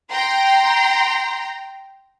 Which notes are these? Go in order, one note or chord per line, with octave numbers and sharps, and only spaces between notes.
G5 A#5 C6